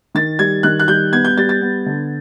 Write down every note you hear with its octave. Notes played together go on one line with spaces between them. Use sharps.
D#3 A6
G3 G#6
D#3 F#6
F#6
G3 G6
B3 G#6
G6
G3 A6
A6
B3
D3